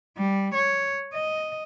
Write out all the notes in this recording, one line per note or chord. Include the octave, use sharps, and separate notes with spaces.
G3
C#5
D#5